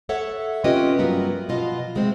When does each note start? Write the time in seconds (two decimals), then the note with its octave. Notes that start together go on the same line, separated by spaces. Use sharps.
0.09 A4 C#5 E5 F#5
0.64 C4 C#4 F4 G4 B4 D#5
0.99 G2 F#3 B3 E4 F4 A#4
1.49 B2 F3 F4 D#5 F5
1.95 F#3 G#3 A3 C4